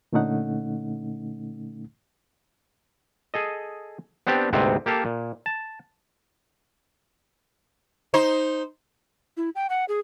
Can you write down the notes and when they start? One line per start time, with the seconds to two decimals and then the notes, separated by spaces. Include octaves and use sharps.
0.13 A#2 D3 A3 C#4 D#4 F#5
3.34 G#4 A4 D#5
4.27 B3 C4 D4 G4 D5
4.53 D2 G#2 C3 B3 C4
4.86 A#3 G4 A4 F5 A5
5.05 A#2
5.46 A5
8.14 D#4 C5
9.37 E4
9.55 G5
9.70 F#5
9.88 G#4